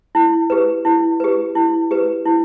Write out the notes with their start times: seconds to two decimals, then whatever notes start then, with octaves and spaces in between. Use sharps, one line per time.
0.15 E4
0.50 G4 B4
0.85 E4
1.20 G4 B4
1.55 E4
1.91 G4 B4
2.26 E4